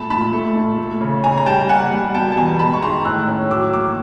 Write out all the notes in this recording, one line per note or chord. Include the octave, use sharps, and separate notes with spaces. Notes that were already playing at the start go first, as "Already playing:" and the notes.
Already playing: A#2 A3 A5 B5
A#2 A5 B5
A3
A#2
A3
C#3
C#3 G#5 A#5
A#5
G3 G5 A5
A#3 F#5 G#5
G3
B2 G5 A5
A5
E2 G#5 A#5
G#3 A5 B5
C#6
D#3 A#5 C6
A2 E6 F#6
C#4
F#3 D6 E6
A#3 D6 E6